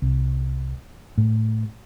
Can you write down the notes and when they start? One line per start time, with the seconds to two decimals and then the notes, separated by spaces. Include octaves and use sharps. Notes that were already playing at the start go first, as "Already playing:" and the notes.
0.02 C2
1.18 A2